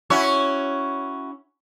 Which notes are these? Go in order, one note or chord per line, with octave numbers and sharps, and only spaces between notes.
C#4 E4 F#4